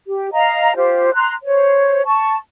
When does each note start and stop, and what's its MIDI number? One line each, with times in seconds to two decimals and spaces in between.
0.06 0.30 67
0.32 0.75 75
0.32 0.75 77
0.32 0.75 82
0.75 1.13 65
0.75 1.13 67
0.75 1.13 72
1.14 1.32 82
1.14 1.32 84
1.14 1.32 90
1.44 2.01 72
1.44 2.01 73
2.05 2.35 81
2.05 2.35 85